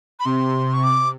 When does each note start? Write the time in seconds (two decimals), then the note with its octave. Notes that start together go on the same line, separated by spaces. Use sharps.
0.20 B5
0.25 C3 C6
0.73 C#6
0.83 D6